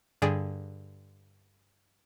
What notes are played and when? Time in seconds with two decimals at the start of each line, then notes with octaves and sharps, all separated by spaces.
0.22 G2 D3 G#4 D5